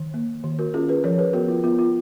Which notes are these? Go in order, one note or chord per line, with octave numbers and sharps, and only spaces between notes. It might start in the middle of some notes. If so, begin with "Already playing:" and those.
Already playing: D#3
A#3
D#3
F#4 A#4
C#4 F4 G#4
G#4 B4
F3 A#4 C#5
G#4 B4
B3 F#4 A#4
F4
B3 F4
F4